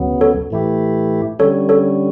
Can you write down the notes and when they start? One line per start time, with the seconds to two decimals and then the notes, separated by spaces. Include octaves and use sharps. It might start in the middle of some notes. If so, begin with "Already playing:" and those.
Already playing: D2 C#3 F#3 B3
0.21 A4 C#5
0.51 A2 E3 A3 E4 G4
1.39 D3 G3 C#4 A4 C#5
1.69 A4 C#5